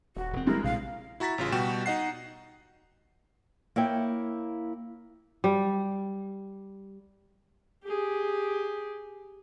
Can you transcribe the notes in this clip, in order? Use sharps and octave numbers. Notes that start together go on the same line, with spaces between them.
D#1 F#4
E1 C4
E3 G3 G#3 E4 A#4
A#1 C3 F5
E4 F#4 A#5 A6 B6
A1 C#3 F4
B2 G3 F#4 G5 E7
D#4 D#5 F#5 C7
A#3 E4 C#5 G5
G3
G4 G#4